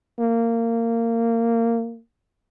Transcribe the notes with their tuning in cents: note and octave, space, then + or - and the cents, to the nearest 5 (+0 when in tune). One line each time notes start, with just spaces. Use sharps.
A#3 -20